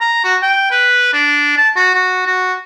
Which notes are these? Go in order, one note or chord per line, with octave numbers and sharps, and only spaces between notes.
A#5
F#4
G5
B4
D4
A5
F#4
F#4
F#4